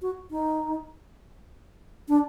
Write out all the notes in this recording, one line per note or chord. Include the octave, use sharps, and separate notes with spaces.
F#4
D#4
D4